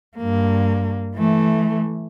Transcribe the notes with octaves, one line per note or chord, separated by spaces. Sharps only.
G2 A#3
E3 A3